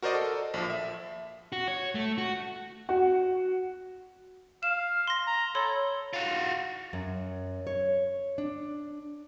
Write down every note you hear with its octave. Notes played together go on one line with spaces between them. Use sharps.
F#4 A#4 C5 D5 D#5
A4
A#1 F3
E5
F#4
C#5
A3
F#4
F#4
F5 E7
C6 A#6
A#5
A4 C#5 B5 C6
F4 F#4
F#2
C#5
D4